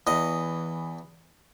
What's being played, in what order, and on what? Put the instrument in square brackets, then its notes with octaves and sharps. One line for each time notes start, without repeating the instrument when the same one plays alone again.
[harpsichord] E2 D#5 [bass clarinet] E3